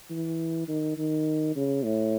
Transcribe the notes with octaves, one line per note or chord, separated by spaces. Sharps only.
E3
D#3
D#3
C#3
A2